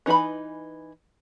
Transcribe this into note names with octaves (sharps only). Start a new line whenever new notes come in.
E3 D#4 B4 G#5 B5